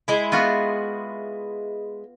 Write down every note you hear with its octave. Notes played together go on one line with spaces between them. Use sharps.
G#3 E4
B3 F4 F#4